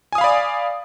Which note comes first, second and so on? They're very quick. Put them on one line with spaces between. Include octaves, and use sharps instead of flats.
G#5 D#6 F5 B5 D5